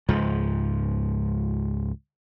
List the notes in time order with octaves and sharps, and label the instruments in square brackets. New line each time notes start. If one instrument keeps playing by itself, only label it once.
[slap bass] C#2 G#2 F3